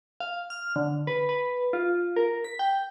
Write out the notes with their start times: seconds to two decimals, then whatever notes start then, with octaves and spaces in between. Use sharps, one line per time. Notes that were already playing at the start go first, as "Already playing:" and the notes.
0.20 F5
0.50 F6
0.76 D3
1.07 B4
1.29 B4
1.73 F4
2.16 A#4
2.45 B6
2.59 G5